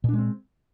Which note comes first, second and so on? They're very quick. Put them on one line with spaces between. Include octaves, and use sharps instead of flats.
A#2 D4 G#3 C4